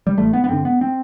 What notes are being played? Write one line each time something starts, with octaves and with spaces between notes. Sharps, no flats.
G3
A1 A3
B3
B3
G2 D3 C4
B3
C4